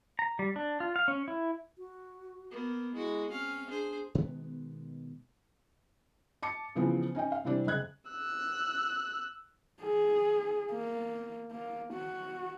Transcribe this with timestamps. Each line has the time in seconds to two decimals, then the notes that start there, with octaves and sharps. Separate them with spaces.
0.19 A#5
0.39 G3
0.56 D4
0.80 F4
0.96 F5
1.08 C#4
1.28 E4
1.78 F#4
2.51 A#3 B3
2.94 G#3 E4 F#4
3.30 C4 C#4 F5
3.70 D4 G#4 C5
4.15 B2 D#3 G#3 B3
6.43 A5 D6 C#7
6.76 C#3 E3 F3 B3 C4
7.15 C#4 D#4 D#5 G5
7.32 F5
7.45 C3 E3 G3 C4 D4
7.67 F#1 D#5 F#6 G#6
8.10 E6 F#6
9.82 G#4
10.72 A#3
11.52 A#3
11.93 F#4